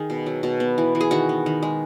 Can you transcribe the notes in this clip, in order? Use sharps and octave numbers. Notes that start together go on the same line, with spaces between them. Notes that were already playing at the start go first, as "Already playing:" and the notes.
Already playing: D#3 G#4
B2
F#3
B2
B3
E3
E3
G#4
D#3 F#4
B3
D#3
G#3